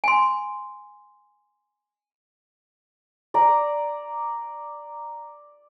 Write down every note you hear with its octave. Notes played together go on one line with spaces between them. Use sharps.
G#5 C6
D5 A#5